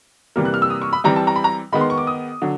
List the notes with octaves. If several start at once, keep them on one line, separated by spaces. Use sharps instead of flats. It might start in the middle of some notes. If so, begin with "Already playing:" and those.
C3 E3 G3 A#3 F6
F#6
F6
E6
D#6
C#6
B5
E3 G3 C4 A#5
A5
A#5
B5
A#5
D#3 G#3 B3 B5
C6
C#6
D6
D#6
D3 F#3